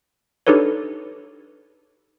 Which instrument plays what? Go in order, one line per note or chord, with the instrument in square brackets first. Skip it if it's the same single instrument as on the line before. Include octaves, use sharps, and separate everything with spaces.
[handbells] D4 D#4 G4 A4 B4 C#5